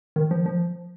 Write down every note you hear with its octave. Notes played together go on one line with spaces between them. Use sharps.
D#3
F3
F3